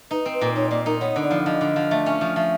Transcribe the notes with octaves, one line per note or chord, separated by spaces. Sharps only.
D#4 B4
C4
B4
A#2
D#4 C#5
A#2 D5
D#4 A#4
B3 C#5
D3
D5
F3
F3 D#5
D3
F3
A3
C#4
F3
F3 E5